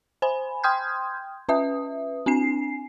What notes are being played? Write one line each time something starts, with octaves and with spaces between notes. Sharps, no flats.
C5 G#5 B5
G5 C6 D#6 F6 G6 G#6
C#4 B4 E5 D#6
C4 D4 G#5 C7